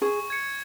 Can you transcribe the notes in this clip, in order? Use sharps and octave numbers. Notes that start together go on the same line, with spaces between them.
G#4 C#6
G#6 C#7